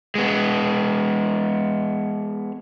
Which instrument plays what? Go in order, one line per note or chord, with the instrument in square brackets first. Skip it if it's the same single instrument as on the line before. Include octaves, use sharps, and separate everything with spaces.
[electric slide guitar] G#3 B3